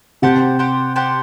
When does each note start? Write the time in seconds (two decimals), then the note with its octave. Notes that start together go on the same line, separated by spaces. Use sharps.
0.22 C3 G4 C5 F#5 A5
0.59 G4 C5 F#5 A5
0.96 G4 C5 F#5 A5